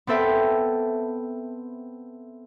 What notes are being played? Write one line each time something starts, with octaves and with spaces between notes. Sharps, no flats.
B3 C4 A4 E5 G5 A5